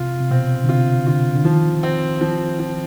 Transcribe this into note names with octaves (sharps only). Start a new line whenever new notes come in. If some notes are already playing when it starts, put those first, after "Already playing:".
Already playing: C3 F4
C3
B2 C4
D3
C3 F4
D3 F4
D3
D#3 F3
C4
F3
F3